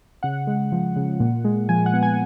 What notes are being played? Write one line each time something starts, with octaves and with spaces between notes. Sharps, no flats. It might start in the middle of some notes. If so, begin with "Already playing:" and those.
C#3 F#5
G#3
F3
C#3
A#2
G#3
F3 G#5
F#5
B3
G#5